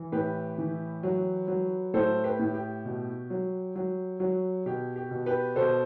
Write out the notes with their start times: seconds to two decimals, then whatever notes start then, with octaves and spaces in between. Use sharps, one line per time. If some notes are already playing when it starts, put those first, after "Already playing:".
Already playing: E3
0.12 A2 G4 B4
0.58 E3
1.03 F#3
1.48 F#3
1.94 A2 A4 C5
2.24 G4 B4
2.39 A2
2.54 G4
2.85 B2
3.30 F#3
3.76 F#3
4.20 F#3
4.66 B2 G4
4.96 G4
5.11 B2
5.26 G4 B4
5.56 B2 A4 C5